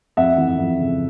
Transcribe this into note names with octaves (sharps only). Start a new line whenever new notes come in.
F2 E5 F#5
E3
F2
C#3